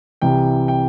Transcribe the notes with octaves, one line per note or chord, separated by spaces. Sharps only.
C2 C3 E3 G5
G5